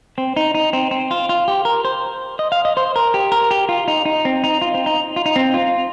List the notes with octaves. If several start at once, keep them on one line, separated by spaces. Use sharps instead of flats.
C4
D#4
D#4
C4
C4
F4
F4
G4
A#4
C5
D#5
F5
D#5
C5
A#4
G4
A#4
G4
F4
D#4
D#4
C4
D#4
F4
C4
D#4
F4
D#4
C4
F4